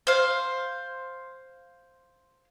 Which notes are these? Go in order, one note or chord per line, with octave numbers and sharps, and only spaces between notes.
C5 F5